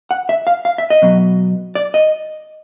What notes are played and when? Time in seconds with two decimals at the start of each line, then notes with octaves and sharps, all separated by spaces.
0.11 F#5
0.29 E5
0.47 F5
0.65 F5
0.78 E5
0.90 D#5
1.02 B2 F#3 B3
1.75 D5
1.94 D#5